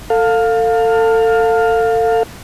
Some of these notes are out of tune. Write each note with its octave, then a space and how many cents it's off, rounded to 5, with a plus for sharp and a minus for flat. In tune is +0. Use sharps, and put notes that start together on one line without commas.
A4 +30 F5 +15